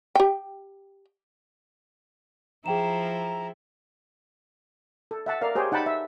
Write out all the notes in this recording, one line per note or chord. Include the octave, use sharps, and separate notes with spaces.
G4 G5
F3 E4 G#4 G5 A#5 E7
A4
E5 F#5 A5
A#4 D5 F5
G4 G#4 C5 C#5 G5
D#4 F#5 G5 A5 B5
E5